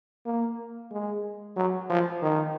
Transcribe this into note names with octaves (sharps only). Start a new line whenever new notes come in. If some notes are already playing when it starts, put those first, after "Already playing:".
A#3
G#3
F#3
F3
D#3